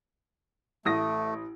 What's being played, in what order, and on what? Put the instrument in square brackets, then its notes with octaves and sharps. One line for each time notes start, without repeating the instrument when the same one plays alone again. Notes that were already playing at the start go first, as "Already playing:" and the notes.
[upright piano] A1 D#6 A#6 [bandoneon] A3